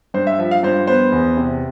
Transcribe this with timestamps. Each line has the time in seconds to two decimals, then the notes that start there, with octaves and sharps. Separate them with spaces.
0.14 G2 C5
0.27 E5
0.38 F3 E5
0.51 F5
0.63 G2 C5
0.87 B3 C5
1.12 E2
1.37 C3